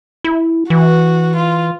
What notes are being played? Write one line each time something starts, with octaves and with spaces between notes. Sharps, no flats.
E4
E3 F#4
F4